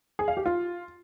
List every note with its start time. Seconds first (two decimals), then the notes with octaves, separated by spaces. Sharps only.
0.19 G#4
0.28 F5
0.37 G4
0.46 F4